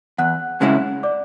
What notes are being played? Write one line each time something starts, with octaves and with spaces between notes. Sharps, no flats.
E2 F#5 F#6
C#3 G#3 C#4 E4
D5 D6